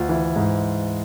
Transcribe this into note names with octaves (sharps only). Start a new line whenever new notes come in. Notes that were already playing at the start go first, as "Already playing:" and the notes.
Already playing: D2 F4
E3
G#2